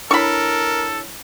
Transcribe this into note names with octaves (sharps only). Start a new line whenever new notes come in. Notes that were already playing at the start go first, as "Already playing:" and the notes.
D4 E4 A4 A#4 C#5 B5 C#6